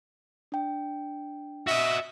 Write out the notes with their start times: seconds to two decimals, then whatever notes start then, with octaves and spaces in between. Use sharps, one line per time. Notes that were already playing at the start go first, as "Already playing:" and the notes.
0.52 D4 G5
1.67 F#4 D#5 E5